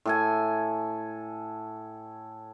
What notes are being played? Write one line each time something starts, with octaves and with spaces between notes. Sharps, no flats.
A2 A4 G#5